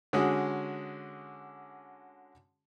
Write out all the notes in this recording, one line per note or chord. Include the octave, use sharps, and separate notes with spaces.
D3 G#3 C#4 F#4 G#4